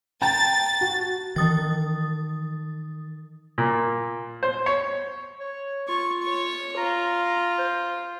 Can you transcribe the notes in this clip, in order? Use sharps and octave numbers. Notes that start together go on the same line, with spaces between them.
G5 A5 A#5 A6
F#4
D#3 E3 D#6 A6
A#2
C5
C#5
C#5
F4 C#6
C#5 C#6
F4 A#5
C5